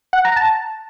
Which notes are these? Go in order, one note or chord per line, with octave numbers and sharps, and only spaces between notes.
F#5
A#5
A5